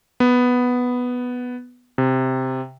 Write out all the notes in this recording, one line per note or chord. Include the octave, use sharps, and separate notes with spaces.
B3
C3